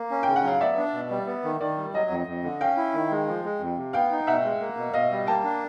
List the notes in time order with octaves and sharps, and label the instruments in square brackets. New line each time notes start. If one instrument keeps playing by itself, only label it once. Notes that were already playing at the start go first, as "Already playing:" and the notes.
Already playing: [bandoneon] A#3
C#4
[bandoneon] C#3 [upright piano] G5
[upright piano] F#5
[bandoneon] F#3 [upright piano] F5
[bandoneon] B3 [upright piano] D5 E5
[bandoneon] D4
B2
G3
B3
D#3
[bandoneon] D#3 [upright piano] D5
[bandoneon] G3
[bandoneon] F#3 [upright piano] D#5
[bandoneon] F2
F2
D3
[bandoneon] C#4 [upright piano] F5 G5
[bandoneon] E4
D#3
G#3
F3
G#3
F2
C3
[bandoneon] B3 [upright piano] F5 G5
[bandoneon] D#4
[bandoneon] B2 [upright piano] E5 F#5
[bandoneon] G#3
A#3
B2
[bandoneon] B2 [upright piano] D#5 F5
[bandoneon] G3
[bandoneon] A#3 [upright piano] G5 A5
[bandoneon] D4